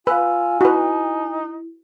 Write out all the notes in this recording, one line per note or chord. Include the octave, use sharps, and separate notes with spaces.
F4 B4 F5 G#5 E6
D#4 E4 F#4 B4